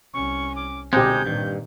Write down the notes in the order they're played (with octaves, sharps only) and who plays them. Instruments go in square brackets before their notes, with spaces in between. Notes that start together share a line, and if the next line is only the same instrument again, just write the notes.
[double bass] C2 C#4 [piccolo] C#6
[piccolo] D6
[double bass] B2 D3 [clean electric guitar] G#3 D#4 [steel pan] C4 G4 [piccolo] G6
[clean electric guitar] G2 [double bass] A#2 D#3